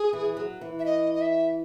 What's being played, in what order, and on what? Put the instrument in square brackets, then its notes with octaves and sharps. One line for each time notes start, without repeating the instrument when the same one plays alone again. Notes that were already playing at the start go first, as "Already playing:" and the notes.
Already playing: [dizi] G#4
[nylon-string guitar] E3
F#3
E3
[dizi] E5
D#5
D#5
E5